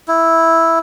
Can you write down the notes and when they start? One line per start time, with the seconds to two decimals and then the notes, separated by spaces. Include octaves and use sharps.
0.08 E4